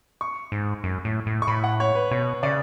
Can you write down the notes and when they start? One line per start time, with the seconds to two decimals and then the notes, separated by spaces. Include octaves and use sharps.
0.21 C#6
0.52 G#2
0.84 F#2
1.05 A2
1.27 A2
1.42 C#6
1.47 A2 B5
1.64 F#5
1.80 C#5
1.95 B4
2.11 B2 C#5
2.43 C#3 D5